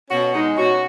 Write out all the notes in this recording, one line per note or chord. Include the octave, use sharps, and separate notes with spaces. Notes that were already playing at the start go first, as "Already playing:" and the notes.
B2 C#4 F#4
G#3 D#4
B2 C#4 F#4